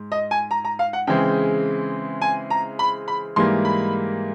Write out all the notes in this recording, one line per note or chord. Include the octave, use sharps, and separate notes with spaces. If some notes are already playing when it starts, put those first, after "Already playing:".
Already playing: G#2
D#5
G#5
A#5
A#5
F5
F#5
C#3 E3 G#3 C4 G5
G#5
A#5
B5
B5
G#2 E3 G3 A#3 C6
B5